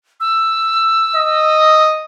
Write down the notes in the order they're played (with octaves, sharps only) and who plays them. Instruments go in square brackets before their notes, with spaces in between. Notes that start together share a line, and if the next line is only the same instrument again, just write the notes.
[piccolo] E6
[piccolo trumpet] D#5